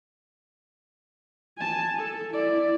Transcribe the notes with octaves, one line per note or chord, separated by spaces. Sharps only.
G#5 A5
A4
E4 D5